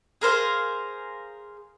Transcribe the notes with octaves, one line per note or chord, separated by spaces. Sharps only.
G#4 A#4 C5 F5